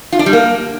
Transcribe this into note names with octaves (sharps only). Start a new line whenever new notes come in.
F4
D4
G3
A#3